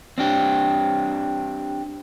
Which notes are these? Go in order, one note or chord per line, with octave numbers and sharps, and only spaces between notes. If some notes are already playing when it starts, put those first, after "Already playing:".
C4 D4 G4